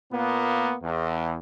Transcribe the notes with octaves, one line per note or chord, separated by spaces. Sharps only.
A#2 A#3 B3
E2